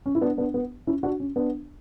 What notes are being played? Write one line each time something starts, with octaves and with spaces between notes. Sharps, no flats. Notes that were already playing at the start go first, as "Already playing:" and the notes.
C#4
E4
B3 D4
B3 D4
B3
C#4 E4
D4 F#4
C#4
B3 D4